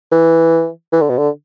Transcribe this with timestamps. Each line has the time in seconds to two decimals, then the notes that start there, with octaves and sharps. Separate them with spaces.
0.12 E3
0.93 E3
1.01 D3
1.09 B2
1.18 D3